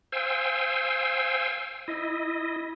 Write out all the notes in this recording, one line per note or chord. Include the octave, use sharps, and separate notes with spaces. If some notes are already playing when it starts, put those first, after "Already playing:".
C5 F5 G5 G#5 E6
E4 D#5